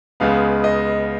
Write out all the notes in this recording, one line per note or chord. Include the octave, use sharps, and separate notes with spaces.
C#2 C#3 G#3 B3 F5
D#5